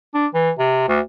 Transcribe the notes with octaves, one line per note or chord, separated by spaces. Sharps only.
D4
E3
C3
D2